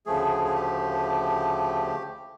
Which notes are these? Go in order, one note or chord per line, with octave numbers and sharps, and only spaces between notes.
D2 C#3 F3 A3 G#4
G#4
G4